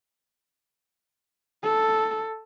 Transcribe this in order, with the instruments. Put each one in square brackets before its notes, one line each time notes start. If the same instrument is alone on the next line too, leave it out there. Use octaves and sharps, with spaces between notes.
[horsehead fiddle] A4